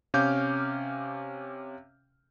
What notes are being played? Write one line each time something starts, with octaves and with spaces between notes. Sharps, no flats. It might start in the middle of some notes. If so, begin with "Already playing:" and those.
C3 C#4 F5 D6 F6 G6